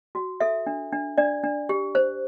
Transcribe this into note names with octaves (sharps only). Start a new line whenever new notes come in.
F#4
A4 E5
D4
D4
D4 D5
D4
G4
C5